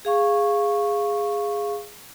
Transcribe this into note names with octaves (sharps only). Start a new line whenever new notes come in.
G#4 F5 C#6